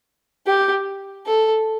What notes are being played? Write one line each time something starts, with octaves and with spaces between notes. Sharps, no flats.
G4
A4